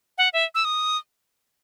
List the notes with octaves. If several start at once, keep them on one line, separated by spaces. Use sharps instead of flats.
F#5
E5
E6
D#6